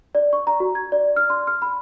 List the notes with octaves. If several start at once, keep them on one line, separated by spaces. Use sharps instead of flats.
D5
C#6
A#5
F#4
G#6
D5
F6
C6
F6
B5